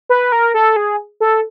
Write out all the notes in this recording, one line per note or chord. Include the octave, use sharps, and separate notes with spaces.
B4
A#4
A4
G#4
A4